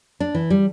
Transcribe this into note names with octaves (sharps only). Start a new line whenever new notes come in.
D4
E3
G3